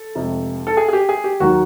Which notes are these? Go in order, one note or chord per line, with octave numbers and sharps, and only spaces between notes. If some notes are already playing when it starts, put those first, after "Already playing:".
Already playing: A4
F1 F2 C3 F3 G#3
A4
G#4
G#4
G4
G#4
G4
D#2 D#3 F#3 F#4